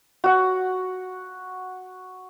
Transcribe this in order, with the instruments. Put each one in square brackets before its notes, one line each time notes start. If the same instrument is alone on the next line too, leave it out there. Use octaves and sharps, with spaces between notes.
[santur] F#4 F#5